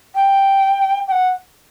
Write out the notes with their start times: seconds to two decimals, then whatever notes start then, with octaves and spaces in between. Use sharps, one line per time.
0.15 G5
1.08 G5
1.12 F#5